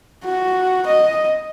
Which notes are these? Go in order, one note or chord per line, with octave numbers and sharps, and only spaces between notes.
F#4
D#5